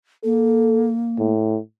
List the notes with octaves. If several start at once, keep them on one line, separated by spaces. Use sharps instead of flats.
A#3 A4
A2